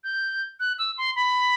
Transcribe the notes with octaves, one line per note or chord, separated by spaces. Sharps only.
G6
F#6
E6
C6
B5